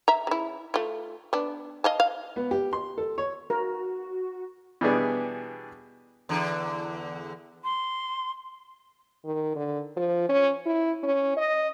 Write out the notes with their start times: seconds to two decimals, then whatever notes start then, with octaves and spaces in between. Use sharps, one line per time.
0.08 E5 A#5
0.27 C#3 E4
0.74 A3 F4
1.33 B3 D4
1.84 D#5 F5 A5
2.00 F5
2.36 B3
2.51 G4
2.73 C6
2.98 A4
3.18 C#5
3.50 F#4 A#4
4.81 B2 E3 G3 B3 D4 G#4
6.29 E2 D3
7.64 C6
9.25 D#3
9.56 D3
9.97 F3
10.29 C#4
10.66 E4
11.03 C#4
11.37 D#5